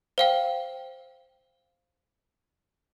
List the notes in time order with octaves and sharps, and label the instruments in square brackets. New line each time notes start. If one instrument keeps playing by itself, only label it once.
[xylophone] C5 F5 G5